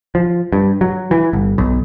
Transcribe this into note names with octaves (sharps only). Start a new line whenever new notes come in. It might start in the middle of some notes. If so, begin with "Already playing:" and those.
F3
G2
F#3
E3
G1
B1